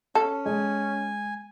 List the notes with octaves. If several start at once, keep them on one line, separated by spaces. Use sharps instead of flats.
C#4 A4
G#3 G#5